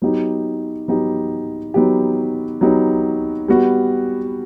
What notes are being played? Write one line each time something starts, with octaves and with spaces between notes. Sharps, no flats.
F#3 B3 D#4 G4
F#3 B3 D#4 G4
F#3 B3 D#4 G4
F#3 B3 D#4 G4
G3 B3 F#4